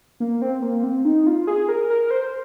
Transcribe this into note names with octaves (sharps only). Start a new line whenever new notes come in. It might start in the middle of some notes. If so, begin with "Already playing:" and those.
A#3
C4
A#3
C4
D#4
F4
G#4
A#4
A#4
A#4
C5